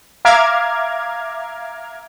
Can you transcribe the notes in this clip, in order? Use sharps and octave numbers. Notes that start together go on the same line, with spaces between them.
E5 F5 A#5 D6 F6 G#6